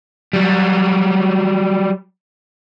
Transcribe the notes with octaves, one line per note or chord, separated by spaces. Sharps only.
F#3 G3